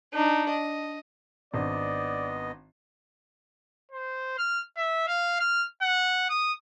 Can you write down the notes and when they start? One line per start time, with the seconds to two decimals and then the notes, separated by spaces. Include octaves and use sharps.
0.14 D4 D#4
0.50 D#5
1.54 G#1 B3 D4 D5 D#5
3.91 C5
4.38 F6
4.77 E5
5.07 F5
5.40 F6
5.82 F#5
6.29 D#6